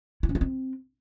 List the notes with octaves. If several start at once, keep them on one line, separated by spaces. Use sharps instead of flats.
E4
C#4
F4
C4